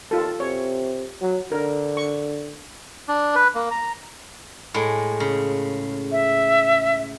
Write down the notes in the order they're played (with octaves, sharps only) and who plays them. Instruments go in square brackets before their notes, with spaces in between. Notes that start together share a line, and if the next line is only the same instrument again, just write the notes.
[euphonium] D#2 [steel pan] F4 A4
[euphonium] C3 [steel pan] C#5
[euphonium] F#3
[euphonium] D3 [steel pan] A#4
[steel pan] C#6
[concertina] D4
B4
A#3
A#5
[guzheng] A2 G#3
C#3
[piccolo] E5